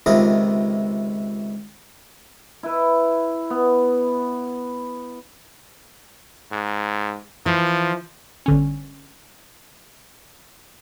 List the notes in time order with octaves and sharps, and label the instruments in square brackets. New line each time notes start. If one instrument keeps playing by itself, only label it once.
[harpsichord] C#2 C3 D#3 E4 F4 D#5
[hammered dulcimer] E4 B4
B3
[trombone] G#2
[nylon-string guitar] E3 [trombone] F3
[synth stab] G1 D3 C#4